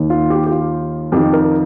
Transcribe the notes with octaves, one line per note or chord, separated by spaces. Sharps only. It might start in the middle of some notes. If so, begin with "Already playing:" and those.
Already playing: D#2 D#3
F4
G4
G4
F4
F2 D#3 G4
A#4